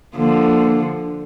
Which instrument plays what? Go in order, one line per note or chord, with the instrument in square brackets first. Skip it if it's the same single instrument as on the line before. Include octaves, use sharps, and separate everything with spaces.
[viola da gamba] D3 F3 [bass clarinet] A#3